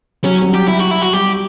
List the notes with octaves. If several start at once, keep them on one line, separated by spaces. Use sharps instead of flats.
F#3 C#4
F#3
G3
G4
E4
F#4
E4
F#4
G3 G4